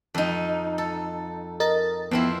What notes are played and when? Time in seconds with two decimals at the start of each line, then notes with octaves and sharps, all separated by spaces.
0.14 F2 D#4
0.78 A4
1.60 A#4 D#5 A6
2.11 F2 B3 C4 E4